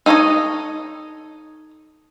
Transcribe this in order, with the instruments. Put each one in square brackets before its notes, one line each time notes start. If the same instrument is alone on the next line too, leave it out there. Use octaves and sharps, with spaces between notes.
[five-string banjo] D#4 A4 C5 C#5 D#5